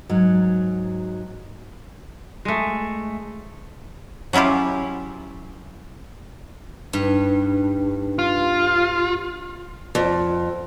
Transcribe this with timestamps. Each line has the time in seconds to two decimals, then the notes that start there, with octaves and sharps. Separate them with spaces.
0.09 G#2 F#3
2.45 G#3 A3
4.33 F#3 C#4 E4 F4 G4
6.93 G2 D4 D#4 B4
8.19 F4
9.95 F2